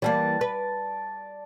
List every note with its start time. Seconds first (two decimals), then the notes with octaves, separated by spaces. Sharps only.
0.02 E3 G3 A#3 D5 A5
0.41 B4